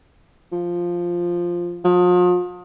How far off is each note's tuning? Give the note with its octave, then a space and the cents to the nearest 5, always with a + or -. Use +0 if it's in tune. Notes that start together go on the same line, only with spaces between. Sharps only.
F3 +0
F3 +40